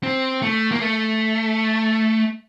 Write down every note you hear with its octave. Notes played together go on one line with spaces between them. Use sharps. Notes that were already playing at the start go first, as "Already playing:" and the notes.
C4
A3
A#3
A3